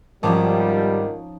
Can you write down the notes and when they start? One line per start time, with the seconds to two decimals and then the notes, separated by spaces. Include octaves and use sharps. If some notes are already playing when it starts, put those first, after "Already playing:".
0.23 G#1 D#3 F3 G3 C#4 D#4 A5 D6